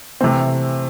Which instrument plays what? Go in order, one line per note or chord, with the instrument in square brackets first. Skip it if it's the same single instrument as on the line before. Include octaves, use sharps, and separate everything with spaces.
[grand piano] C3 E3 A3 C4